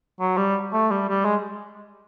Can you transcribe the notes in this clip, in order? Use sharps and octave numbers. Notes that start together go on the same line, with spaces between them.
F#3
G3
A3
G3
G3
G#3